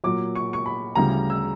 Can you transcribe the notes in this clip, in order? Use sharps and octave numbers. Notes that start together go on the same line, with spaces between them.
A#2 F#3 D6
C#6
C#6
B5
D2 C#3 E3 G3 A#5
E6